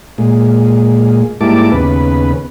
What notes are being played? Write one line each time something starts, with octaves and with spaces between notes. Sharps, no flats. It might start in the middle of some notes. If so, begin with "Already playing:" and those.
A#2 G#3
G#2 G3 A#3 E4 A5 D6
D#2 C#3 B3 B4